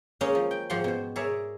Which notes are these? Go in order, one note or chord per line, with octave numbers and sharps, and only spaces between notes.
G#3 A#3 C#4 D#4 G#4 D#5
F3
G5
G#2 F3 G4 F#5 C6
B2 C5
G#4 A#4 C#5 D5 E5